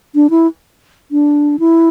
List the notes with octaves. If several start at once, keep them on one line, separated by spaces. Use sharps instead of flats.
D4
E4
D4
E4